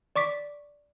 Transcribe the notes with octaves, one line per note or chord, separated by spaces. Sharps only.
D5 C#6 D6 B6